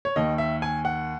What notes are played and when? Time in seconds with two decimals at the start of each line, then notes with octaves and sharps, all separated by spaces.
0.05 C#5
0.16 D#2 D#3 D#5
0.38 E5
0.62 G#5
0.85 F#5